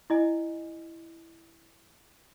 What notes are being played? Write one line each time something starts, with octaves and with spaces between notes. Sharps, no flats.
E4 D#5 G#5